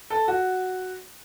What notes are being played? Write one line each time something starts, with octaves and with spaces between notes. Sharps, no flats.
A4
F#4